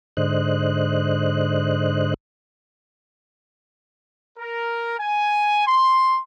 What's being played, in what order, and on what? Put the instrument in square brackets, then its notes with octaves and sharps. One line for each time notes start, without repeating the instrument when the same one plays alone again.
[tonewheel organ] G#2 D3 C5 D#5 F#6
[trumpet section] A#4
G#5
C6